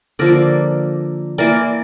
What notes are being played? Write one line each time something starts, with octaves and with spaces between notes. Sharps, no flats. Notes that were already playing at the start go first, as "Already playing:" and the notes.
D3 F3 A#3 A#4 D5
E3 A#3 A#4 D5